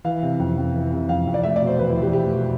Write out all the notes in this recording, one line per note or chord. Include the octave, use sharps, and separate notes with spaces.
E3 F5
C3
F2
F2
E3
C3
F2 F5
F2
D5
A3 E5
D5
B2
C5
E2 B4
E4
E2
G4
A3 G4
B2